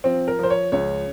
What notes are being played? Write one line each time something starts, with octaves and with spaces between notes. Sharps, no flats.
F3 C4
A#4
F3 C5
C#5
C#2 C#5